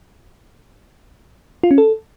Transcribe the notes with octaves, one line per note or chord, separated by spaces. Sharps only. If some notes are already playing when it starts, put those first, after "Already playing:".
F4
C#4
A4